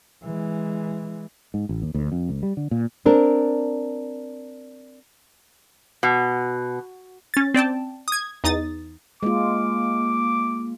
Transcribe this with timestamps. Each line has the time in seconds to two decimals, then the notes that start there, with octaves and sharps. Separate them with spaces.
0.23 E3 G#3
1.54 G#2
1.69 A1
1.82 D#2
1.94 D2
2.12 F2
2.29 C#2
2.43 G3
2.57 D3
2.71 A#2
3.06 C4 D4 A#4
6.03 B2
7.34 C#4 A6
7.54 C4 D5 G5 A5
8.08 D#6 G#6
8.44 E2 D#4 D#6 A6
9.23 G#3 A#3 F4 D6